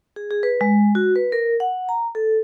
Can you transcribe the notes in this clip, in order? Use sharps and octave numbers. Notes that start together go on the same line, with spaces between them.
G#4
G#4
B4
G#3
F#4
B4
A#4
F#5
A#5
A4